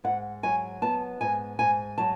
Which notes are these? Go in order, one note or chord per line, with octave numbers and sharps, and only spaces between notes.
G#2 F#5
F#3 G#5
B3 A5
G#2 G#5
G#2 G#5
F#3 A5